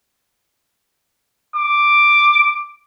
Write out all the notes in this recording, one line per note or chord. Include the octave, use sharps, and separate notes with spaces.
D6